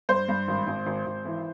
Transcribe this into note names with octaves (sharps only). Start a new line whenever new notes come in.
G2 C5
G2
G#1
G#1
G#1
G#1
E3